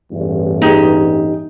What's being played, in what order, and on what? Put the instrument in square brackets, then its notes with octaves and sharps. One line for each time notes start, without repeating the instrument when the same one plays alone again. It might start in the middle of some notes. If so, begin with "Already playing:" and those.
[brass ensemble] A1 E2 G2
[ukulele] D#4 G4 G#4